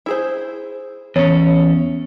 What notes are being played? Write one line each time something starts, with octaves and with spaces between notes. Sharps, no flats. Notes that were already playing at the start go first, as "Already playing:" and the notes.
E4 G#4 C5
E2 C#4 C#5